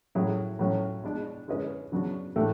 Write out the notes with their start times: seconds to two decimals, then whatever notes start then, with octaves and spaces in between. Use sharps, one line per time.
0.15 A2 F#3 C#4 E4 G#4
0.59 A2 F#3 C#4
1.04 B2 G#3 D4
1.48 D3 G#3 C#4 G#4 B4
1.92 C#3 F#3 B3 D4 F#4
2.36 A2 E3 A3 D4